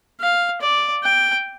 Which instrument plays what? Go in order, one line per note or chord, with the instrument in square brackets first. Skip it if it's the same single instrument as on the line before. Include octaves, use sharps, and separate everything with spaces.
[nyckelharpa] F5
D5
G5